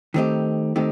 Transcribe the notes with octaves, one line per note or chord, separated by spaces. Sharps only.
D#3 A3 C4 D#4 G4
D#3 A3 C4 D#4 G4